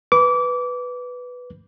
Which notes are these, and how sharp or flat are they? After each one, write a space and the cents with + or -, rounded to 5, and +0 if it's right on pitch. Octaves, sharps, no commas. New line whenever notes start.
B4 +0 D6 -25